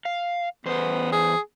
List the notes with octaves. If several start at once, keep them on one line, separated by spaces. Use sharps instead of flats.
F5
E2 B3 C5
G#4